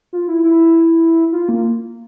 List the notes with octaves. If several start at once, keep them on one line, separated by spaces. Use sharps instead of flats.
F4
E4
E4
F4
A#3